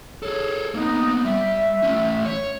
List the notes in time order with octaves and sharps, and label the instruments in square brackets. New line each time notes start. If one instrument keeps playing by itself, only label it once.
[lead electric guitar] G#4 A4 [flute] C#5
[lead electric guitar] A#3 B3 [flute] D#4
[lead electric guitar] G3 [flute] E5
[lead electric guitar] A3 C#4
C#5